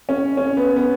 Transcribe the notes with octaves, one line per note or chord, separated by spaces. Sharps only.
C#4
C#4
B3
B3